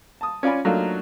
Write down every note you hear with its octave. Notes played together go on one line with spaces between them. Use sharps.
A5 D#6
C#4 F4 D5 G#5 B5
F#3 A3 A#3 D4 D#4 F4